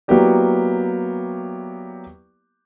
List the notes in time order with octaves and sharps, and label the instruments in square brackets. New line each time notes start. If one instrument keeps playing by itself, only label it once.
[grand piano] F#3 A#3 B3 E4 G4 D5